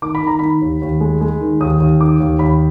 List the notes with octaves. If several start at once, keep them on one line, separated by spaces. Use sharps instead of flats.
D#3 D6
B5
D#3 A#5
D#3 B5
D#2
D#2
G#3
G#3
D#3
D#2 D#6
D#2
D#3 D6
D#2
D#2 B5